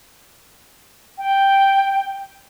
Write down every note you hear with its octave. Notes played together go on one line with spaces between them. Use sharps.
G5